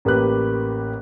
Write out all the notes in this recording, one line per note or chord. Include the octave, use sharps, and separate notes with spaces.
A1 A#3 G4 B4 F#6